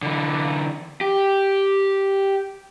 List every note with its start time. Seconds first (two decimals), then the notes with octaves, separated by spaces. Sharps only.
0.02 D3 E3
1.01 G4